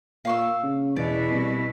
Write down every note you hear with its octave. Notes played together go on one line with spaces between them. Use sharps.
A#2 F5 C#6 E6
C#3
E2 B2 E4 D5
C2